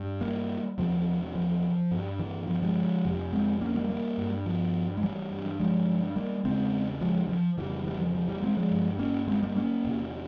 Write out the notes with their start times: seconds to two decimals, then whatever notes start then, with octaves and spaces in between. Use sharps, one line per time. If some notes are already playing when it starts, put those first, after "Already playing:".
Already playing: G2
0.21 G3 A#3
0.78 E2 C3 F3
1.35 F3
1.91 G2
2.19 E3
2.47 F3
2.62 F3 G#3
3.05 F2 C3
3.33 G#3 C4
3.61 A#3 C#4
3.75 G3 A#3
3.89 G3 A#3
4.18 G2
4.46 F3
4.97 G#3
5.03 E3 G3
5.31 G2
5.60 F3 G#3
6.16 G3 A#3
6.44 E2 C#3 G#3 C4
7.01 F3 G#3
7.29 F3
7.57 F2 C#3 E3 G3
7.86 E3 G3
8.00 F3
8.15 F3
8.29 E3 G3
8.43 G#3 C4
8.57 F3 G#3
8.71 G2
8.99 A#3 C#4
9.28 G#3 C4
9.42 G3 A#3
9.56 A#3 C#4
9.85 E2 C3